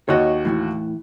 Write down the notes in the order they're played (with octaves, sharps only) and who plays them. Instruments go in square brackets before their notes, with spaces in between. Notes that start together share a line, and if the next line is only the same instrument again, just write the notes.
[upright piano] D#2 F#4 [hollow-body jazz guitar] C#5 D#5
[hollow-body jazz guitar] A2 E3 E4